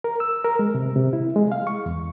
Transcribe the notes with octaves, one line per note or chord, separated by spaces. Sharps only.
A#4
E6
A#4
G#3
C3
C3
E4
G#3
F5
C#6
E2